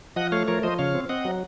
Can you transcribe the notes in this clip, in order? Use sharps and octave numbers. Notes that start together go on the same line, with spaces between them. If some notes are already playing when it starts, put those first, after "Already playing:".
F3 D#5 F#5
A3 C#5 F5
F3 A#4 C#5
F3 C5 D#5
C#3 C#5 F5
C4
C4 D#5 F#5
F#3